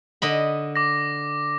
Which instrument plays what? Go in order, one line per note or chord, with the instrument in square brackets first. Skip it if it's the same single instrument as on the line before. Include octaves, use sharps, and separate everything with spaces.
[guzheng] D3 D#5 B5
[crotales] D6 A#6